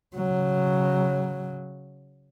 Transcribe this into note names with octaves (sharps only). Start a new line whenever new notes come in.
C#3 F#3